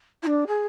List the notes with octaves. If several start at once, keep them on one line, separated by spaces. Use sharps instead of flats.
E4
D4
G#4